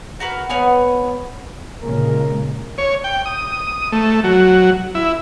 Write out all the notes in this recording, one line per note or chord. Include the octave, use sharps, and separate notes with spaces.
F#4 A#4 B4
B3 C#5 F#5 G#5
A#2 C#3 G#3 A#4
C#5
G5
D#6
A3
F#3
E4